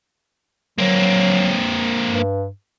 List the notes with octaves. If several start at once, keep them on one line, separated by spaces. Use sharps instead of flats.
F#3 A#3 C4
G2